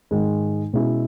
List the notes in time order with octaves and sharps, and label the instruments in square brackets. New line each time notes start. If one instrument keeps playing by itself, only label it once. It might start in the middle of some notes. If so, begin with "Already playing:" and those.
[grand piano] G#2 D#3 G#3
B2 G#3 C#4 E4 G#4